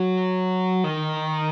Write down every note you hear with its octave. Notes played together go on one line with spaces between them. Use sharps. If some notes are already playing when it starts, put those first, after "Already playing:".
Already playing: F#3
D#3